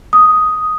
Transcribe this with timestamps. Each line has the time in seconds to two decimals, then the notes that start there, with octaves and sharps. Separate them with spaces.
0.13 D#6